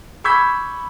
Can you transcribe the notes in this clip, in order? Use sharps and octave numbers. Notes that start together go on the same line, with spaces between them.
B5 C#6 E6 G6 G#6 B6